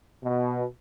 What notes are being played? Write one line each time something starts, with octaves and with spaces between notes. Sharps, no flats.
B2